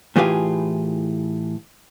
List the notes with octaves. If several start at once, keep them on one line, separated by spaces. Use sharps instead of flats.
A2 E3 F4 G4 G#4 F5